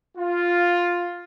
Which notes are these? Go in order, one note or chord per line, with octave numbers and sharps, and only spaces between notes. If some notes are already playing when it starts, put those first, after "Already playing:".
F4